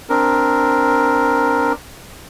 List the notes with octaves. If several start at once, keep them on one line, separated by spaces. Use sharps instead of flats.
C4 D4 A#4